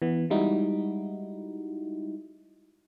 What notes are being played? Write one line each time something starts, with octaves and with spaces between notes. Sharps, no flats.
E3 B3
G3 G#3 D#4 E4 F#4